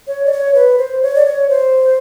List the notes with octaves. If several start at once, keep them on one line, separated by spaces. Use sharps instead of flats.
C#5
D5
C#5
B4
C5
C#5
D5
C#5
C5